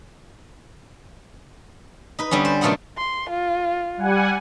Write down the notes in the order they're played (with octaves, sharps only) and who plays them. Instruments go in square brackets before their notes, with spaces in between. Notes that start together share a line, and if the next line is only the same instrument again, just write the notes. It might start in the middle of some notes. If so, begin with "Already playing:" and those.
[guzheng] D#4 B4
D3 G3 B3 C#4
C5
F#2 B2 A3 F4 G#4 F#5
[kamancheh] C6
F4
[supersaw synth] G3 F#5 G#5